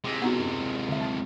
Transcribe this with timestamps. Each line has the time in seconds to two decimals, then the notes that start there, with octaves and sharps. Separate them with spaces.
0.04 C3 G#3 C6 D6 B6
0.22 B3 D#4 F#4
0.37 F#2
0.89 D3 E5
1.01 A5 A6 D7